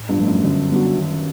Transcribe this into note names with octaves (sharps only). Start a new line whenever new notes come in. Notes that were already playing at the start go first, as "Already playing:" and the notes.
Already playing: A2
G1 G2
F3 A3
F#2
F#2 D3
G3 B3 D4 F#4
D#3